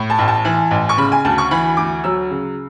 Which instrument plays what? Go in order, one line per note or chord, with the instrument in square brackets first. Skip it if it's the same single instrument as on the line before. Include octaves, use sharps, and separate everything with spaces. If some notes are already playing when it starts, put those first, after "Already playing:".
Already playing: [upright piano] A2
A5
A1
A5
E3
A1
C#6
C#3 B5
G#5
D2 A5
C#6
E3 B5
D2 D6
F#3 E6
C#3